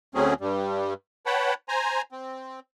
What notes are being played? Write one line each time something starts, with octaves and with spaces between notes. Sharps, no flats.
D2 F#3 A3 C4 C#4 G#4
G2 G3
B4 C#5 F#5 G5 A5 B5
C5 G#5 A#5
C4